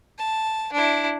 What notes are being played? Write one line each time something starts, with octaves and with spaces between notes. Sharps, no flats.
A5
D4 E4